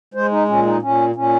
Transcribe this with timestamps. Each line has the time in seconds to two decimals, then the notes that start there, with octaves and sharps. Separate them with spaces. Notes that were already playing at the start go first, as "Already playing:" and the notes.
0.14 G#3 C5
0.31 D#4
0.48 A#2 C#4
0.66 D#4
0.82 A#2 C#4
1.16 A#2 C#4